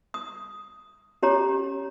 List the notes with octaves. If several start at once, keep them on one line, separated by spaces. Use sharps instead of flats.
D#6
C#4 G4 C#5 A#5 D6